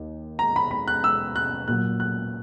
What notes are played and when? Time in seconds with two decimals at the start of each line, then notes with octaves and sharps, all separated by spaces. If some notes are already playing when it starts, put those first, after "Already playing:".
Already playing: D#2
0.39 A#5
0.56 B5
0.71 B5
0.88 F#6
1.04 E6
1.36 F#6
1.68 A#2 F#3 F#6
2.00 F#6